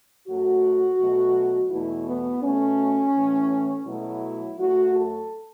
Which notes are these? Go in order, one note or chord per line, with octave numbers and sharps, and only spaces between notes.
F#2 F#3 A3 F#4
B2 F#3 A3
E2 B2 A3 E4
B3
B2 A3 C#4
A2 E3 A3
B2 F#3 A3 E4
F#2 F#3 A3 F#4
A4